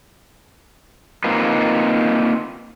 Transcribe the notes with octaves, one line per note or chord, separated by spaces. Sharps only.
A#3 C4 D#4 F4 B4